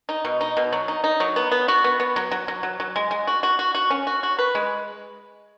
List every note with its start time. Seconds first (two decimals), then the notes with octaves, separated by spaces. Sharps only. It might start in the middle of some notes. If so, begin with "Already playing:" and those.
0.09 D#4
0.25 B2
0.41 D#4
0.57 B2
0.72 F#3
0.88 D#4
1.04 D#4
1.20 F#3
1.36 B3
1.52 B3
1.68 F#4
1.84 B3
2.00 B3
2.16 F#3
2.31 F#3
2.48 F#3
2.63 F#3
2.80 F#3
2.96 G#3
3.11 G#3
3.27 F#4
3.43 F#4
3.59 F#4
3.75 F#4
3.90 C#4
4.07 F#4
4.23 F#4
4.39 B4
4.55 G#3